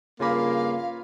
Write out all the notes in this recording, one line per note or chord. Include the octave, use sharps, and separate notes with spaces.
G2 C#3 A#3 F4 F5 G#5 B5